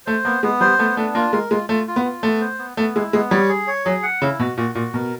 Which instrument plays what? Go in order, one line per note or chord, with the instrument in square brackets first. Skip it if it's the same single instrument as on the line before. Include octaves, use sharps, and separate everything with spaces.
[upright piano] A3 [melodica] C5
[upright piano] A#3 [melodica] B3
[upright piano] G#3 [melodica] B3
[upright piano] G3 [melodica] C5
[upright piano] A3 [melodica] B3
[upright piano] A3 [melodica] D4
[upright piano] A#3 [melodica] F4
[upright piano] G#3 [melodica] A#4
[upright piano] G#3 [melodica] F4
[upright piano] A3 [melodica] F4
[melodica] F4
[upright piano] B3
[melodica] F4
[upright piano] A3 [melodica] B3
[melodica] C5
B3
[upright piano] A3 [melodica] B3
[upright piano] G#3 [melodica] E4
[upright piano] G#3 [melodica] B3
[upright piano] G3 [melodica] C#5
[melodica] G#4
C#5
[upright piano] F#3 [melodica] G#4
[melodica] F#5
[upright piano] C#3 [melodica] E4
[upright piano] B2 [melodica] F#4
[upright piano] A#2 [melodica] F#4
[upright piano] A#2 [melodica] F#4
[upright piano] B2 [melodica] A#4